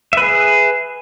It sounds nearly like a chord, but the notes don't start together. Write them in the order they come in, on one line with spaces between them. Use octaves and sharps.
E5 B4 G#4